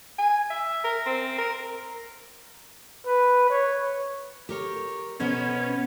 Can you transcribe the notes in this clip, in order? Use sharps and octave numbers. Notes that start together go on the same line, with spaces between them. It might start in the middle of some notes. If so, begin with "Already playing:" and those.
G#5
E5
A#4
C4
A#4
B4
C#5
G4 A#4 C#5
B2 B3 C#4 C5